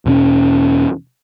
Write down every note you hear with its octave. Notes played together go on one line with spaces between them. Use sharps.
E2 B2 C4 C#4